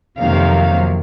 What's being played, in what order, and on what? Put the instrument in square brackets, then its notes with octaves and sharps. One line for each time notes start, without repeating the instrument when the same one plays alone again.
[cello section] F2 C3 D#3 F#3 A#3 F5